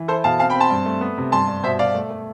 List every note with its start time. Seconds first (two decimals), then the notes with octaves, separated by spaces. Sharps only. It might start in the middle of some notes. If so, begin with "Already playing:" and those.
Already playing: E3
0.08 E4 A4 C5
0.24 B2 F5 A5
0.39 C4 F5 A5
0.50 G5 B5
0.55 C4
0.60 A5 C6
0.70 G2
0.85 A3
1.01 B3
1.18 C3
1.32 G2 A5 C6
1.48 G2
1.63 B2 C5 E5
1.79 B2 D5 F5
1.94 A3
2.10 A3